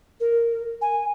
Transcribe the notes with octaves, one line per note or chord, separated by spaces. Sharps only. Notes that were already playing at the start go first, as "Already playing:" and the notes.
A#4
G#5